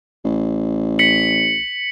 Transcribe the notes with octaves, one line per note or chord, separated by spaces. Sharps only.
A1
B6 C#7 F#7